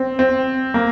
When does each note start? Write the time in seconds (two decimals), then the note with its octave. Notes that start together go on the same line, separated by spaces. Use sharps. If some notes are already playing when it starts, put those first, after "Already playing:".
Already playing: C4
0.19 C4
0.74 A#3